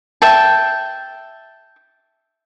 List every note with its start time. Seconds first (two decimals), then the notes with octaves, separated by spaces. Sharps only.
0.22 E5 G5 A5